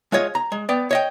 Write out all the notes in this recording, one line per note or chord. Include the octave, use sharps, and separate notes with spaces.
G#3 F4 C#5 D#5
A#5
G#3
B3 D5 G5
C#5 D#5 G5